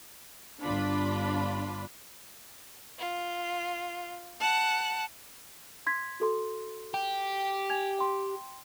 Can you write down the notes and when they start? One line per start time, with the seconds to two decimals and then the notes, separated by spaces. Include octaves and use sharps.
0.63 G1 D4 F4 B5
2.98 F4
4.41 F#5 A5 F#6
5.86 C6 G#6 B6
6.20 F#4 A4 C6
6.94 G4
7.69 G#5 G#6 F7
7.99 G5 C6